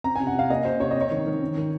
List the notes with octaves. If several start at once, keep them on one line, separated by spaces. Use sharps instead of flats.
C4 A#5
C3 G#5
F#5
C3 F5
A#3 D#5
C3 C5
C3 C#5
C4 D#5
C#5
D#3
D#3
C4
D#3